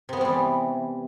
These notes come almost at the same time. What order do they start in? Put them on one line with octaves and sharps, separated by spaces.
C3 B3 G#3 G3 E3